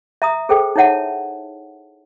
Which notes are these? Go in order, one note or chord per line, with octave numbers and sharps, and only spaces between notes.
E5 A#5 D#6
G#4 A4 C5 G5
D#4 E4 C#5 E5 F#5 A5